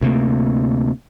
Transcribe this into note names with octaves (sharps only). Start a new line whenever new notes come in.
D2 C3 A3 A#3